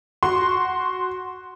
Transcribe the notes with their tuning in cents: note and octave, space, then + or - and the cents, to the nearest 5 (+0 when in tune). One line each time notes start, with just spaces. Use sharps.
F#4 +0 C6 +0